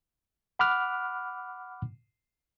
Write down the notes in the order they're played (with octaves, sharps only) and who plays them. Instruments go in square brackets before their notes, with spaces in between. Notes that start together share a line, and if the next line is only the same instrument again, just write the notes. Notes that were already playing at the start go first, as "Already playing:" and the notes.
[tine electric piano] F#5 B5 D6 F6 F#6